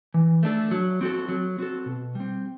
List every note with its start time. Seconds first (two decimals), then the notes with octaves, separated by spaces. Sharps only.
0.14 E3
0.43 A3 D4 A4
0.71 F#3
1.01 C4 F#4 A4
1.29 F#3
1.58 C4 F#4 A4
1.86 B2
2.15 G3 C4